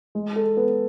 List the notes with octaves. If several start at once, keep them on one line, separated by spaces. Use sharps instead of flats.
G#3
A4
B3